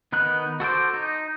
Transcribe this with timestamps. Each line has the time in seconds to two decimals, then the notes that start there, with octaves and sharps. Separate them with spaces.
0.12 D#3 B3 D#4 F#6
0.60 F#4 A4 C5 D6
0.94 D#4